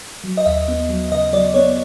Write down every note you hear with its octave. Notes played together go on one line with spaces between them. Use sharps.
F#3
D#5
D#2 E5
B3
F#3
C#3 D#5
F#3 D5
B3 C#5